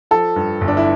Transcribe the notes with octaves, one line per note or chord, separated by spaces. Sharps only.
F3 A4
G2
G1
D4
E4